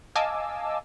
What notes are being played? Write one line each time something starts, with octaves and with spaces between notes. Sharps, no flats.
D#5 F5 G#5 A5 D6 E6